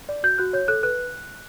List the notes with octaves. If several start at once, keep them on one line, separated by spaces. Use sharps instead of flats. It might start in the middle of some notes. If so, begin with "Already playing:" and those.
D5
F#4 G6
F#4 F#6
C#5 G6
A4 F#6
B4 F#6